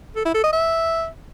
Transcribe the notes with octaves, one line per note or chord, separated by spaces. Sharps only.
A4
E4
A4
D#5
E5